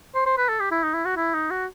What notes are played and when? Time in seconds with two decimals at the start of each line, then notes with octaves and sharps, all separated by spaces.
0.15 C5
0.26 C5
0.38 B4
0.49 A4
0.60 G4
0.72 E4
0.83 D#4
0.94 E4
1.06 F#4
1.17 E4
1.34 D#4
1.51 F#4